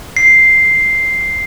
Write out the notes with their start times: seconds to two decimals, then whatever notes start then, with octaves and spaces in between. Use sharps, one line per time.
0.17 C7